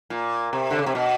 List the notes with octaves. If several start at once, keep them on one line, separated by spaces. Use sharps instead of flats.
A#2
C3
D3
C#3
C3
B2